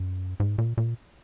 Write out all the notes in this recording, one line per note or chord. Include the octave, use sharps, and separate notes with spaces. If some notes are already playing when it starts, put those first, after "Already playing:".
Already playing: F#2
G#2
A#2
A#2